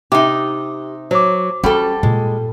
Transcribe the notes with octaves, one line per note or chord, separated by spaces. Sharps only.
C3 D#4 G4 D6
F#3 C5 D6
G3 C#4 F#4 A4
A#2 G#3